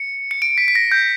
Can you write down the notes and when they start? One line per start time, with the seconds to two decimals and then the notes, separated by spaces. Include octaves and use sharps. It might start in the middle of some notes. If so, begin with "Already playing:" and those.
Already playing: C#7
0.31 C#7
0.42 D7
0.58 B6
0.68 B6
0.75 A#6
0.92 G6